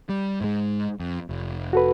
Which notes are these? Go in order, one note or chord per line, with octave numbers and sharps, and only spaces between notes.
G3
G#2 G#3
F2
F1
F#4 A4 B4